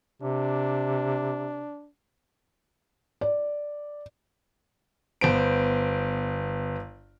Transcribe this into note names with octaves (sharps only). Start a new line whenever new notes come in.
C3 D4
D5
G1 B3 C5 D7